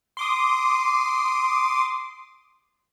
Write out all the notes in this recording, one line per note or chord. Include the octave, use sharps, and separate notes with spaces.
C6 D6 D#6